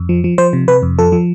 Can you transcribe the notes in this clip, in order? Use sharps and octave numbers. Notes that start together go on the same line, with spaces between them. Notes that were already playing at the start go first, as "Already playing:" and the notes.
Already playing: F2
F3
F3
F3 C5
C3
C3 B4
F2
F3 A4
F3